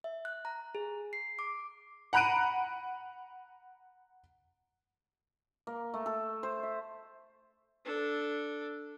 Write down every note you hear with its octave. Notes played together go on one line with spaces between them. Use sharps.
E5
F#6
A#5
G#4
C7
D6
F#5 A#5 B5 F#6 D7 D#7
A#3
A3
A4
C5
E5
D4 A4